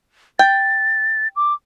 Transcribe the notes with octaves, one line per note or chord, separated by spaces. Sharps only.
G5 A6
D6